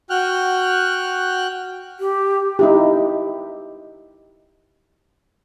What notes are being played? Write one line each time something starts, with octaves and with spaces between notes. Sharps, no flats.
F#4 G5 F6 F#6
G4
D#4 E4 G4